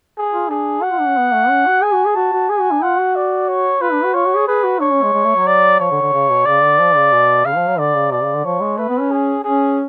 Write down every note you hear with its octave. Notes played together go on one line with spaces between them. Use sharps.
G#4
F4
D4 G#4
F#4 F#5
F4
D4
C#4
B3
A3
C#4
F#4
G#4 G#5
F#4
G#4
F#4 A5
F#4
G#4 G#5
F#4
D4
F4 F#5
F#4
D5
C#5
F4 B4
D4
F#4
F4 C#5
F#4
G#4
G#4 B4
F#4
D4 C#5
C#4
G#3
G#3
A3
F#3
D5
F3 C#5
D3
D3
C#3
B2
C#3 D5
D3
F3
C#3
B2
C#3 F5
F3
F#3
D3 D5
C#3
B2 D5
C#3
D3
F3 C#5
G#3
A3 B4
B3
C#4
G#4
C#4 G#4